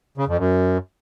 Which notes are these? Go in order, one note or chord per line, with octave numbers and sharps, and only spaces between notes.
C#3
F2
F#2